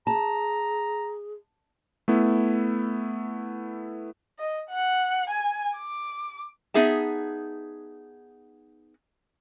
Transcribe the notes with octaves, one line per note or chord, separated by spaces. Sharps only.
G#4 A5 A#5
A3 B3 E4
D#5
F#5
G#5
D6
B3 D#4 G#4 E5 A5